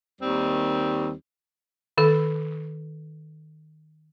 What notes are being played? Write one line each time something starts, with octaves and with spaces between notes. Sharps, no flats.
D#2 D#3 G3 C4
D#3 A4